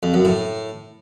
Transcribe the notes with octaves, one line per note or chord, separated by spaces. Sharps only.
F2
F#2
A2